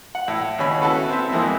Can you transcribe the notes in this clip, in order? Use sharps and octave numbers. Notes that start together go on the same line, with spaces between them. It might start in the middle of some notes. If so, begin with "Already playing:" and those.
F#5
A2
D#2 C#3 C#4 B5
B3 E4 F#4 A4 B4
C4 E5
F2 G#3 A#3 E4 C5